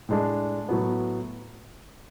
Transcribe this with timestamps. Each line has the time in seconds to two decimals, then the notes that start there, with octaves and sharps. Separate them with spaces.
0.09 A2 G#3 D4
0.69 A2 F#3 B3